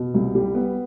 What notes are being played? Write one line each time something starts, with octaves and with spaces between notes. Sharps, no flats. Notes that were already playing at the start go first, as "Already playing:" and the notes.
Already playing: B2
C2
G3
B3